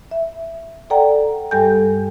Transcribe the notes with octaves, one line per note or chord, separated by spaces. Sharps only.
E5
A4 D5 F#5 G5 A#5
G2 G3 A4 G5 G#5 G6